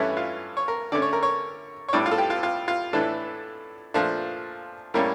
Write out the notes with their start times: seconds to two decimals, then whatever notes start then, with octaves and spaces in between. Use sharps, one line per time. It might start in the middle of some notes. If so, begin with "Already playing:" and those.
Already playing: G2 E3 A3 C#4 E4
0.17 F4
0.57 C#5
0.68 A#4
0.92 D3 A3 C#4 D5
1.02 C#5
1.13 A#4
1.23 C#5
1.88 C#5
1.93 A2 G3 D4 D5
2.06 F4
2.11 A4
2.18 G4
2.30 F4
2.43 F4
2.68 F4
2.93 A2 E3 A3 D4 A4
3.94 A#2 F3 A3 D4
4.94 A2 G3 A#3 C#4 A#4